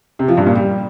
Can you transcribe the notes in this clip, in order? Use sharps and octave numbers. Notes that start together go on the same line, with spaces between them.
C3
F3
G2
A#2
G3